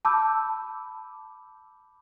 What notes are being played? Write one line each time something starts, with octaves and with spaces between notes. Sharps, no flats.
A5 B5 D6 E6 G6